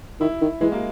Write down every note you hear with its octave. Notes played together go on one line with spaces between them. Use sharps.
D#3 E4
D#3
E3 G#3
A#3